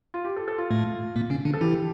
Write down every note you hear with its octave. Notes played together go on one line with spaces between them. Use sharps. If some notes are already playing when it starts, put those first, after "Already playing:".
F4
G4
A4
A4
F4
A2 A3
A#2 A#3
C#3 C#4
D3 D4
A4
E3 E4 G4